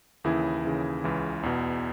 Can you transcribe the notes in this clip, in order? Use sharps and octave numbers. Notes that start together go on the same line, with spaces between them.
D#2 C#3 E3 E4 G#4
D#2 C#3 E3
C#2 C#3 E3
E2 B2